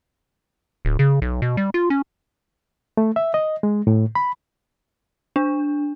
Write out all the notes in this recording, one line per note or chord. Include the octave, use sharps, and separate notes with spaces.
D1
C#3
B1
B2
G3
F4
C#4
A3
E5
D#5
G#3
A2
B5
D4